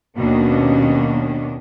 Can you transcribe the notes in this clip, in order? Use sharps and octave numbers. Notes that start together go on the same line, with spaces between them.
D#2 B2 D#3 A#3 C#4 D4